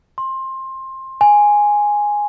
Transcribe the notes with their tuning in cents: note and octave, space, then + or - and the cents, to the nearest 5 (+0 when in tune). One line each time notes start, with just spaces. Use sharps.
C6 +20
G#5 -5